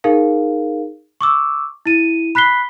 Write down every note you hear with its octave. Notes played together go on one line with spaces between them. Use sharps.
D#4 G#4 A#4 F5
C#6 D6 E6
E4 D#7
B5 F#6 B6 C7 G7